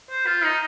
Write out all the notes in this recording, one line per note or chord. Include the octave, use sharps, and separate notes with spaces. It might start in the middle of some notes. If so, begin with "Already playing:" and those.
C5
F4
D#4